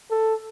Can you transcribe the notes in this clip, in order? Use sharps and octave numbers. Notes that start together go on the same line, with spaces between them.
A4